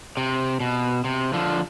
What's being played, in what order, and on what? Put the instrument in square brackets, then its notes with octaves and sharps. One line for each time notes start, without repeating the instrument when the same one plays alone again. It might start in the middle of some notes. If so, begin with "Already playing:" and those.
[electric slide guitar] C3
B2
C3
D3 F3